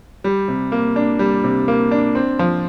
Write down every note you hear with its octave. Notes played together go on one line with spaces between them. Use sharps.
G3
C3
A#3
D4
G3
C3
A#3
D4
C4
F3